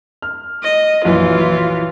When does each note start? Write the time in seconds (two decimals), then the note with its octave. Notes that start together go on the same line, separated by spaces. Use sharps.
0.22 F6
0.63 D#5
1.05 A#1 F#2 E3 F4